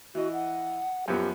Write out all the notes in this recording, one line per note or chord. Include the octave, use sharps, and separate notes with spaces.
E3 F#4 D#5
F#5
F#2 F3 B3 G4